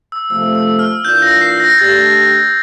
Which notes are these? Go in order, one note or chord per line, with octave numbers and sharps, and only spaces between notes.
E6
C3 F3 A3 E6
E6
F6
E3 A#3 D4 F4 G6
A#6
C7
A#6
A3 D4 G4 A6